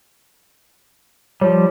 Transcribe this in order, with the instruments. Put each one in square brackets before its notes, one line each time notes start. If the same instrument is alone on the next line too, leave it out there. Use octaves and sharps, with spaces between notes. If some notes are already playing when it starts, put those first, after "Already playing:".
[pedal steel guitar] F3 G3 [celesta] C#5